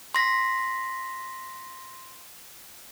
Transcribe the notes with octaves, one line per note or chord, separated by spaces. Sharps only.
C6 A#6 B6